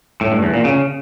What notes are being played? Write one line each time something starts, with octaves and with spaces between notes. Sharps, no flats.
A2
G2
E2
A#2
C#3